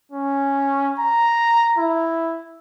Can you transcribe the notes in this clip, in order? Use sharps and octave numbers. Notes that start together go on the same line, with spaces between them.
C#4
A#5
E4